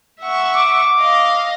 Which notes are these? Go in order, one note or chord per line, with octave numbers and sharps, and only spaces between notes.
E5 F#5 C#6
D6
D#5 F5